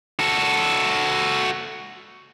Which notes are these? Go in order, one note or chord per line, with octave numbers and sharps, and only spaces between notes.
F#4 A4